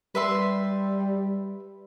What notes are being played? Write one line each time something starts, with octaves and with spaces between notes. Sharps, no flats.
G3 B4 E5 C6